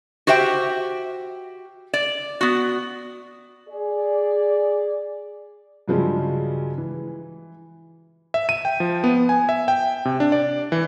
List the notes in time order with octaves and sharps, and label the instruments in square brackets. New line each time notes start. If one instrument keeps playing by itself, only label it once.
[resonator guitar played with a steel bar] F#4 G4 C5 E5 G5
D5
B3 F#4
[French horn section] G#4 D5
[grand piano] G2 C#3 F3 F#3 G#3 C#4
E3
[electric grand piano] E5
D#7
G5
F3
B3
G#5
E5
G5
C3
D4
D5
E3